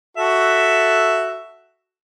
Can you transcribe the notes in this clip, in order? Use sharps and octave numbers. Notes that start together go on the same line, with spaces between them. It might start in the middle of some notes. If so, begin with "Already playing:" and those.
F#4 A4 E5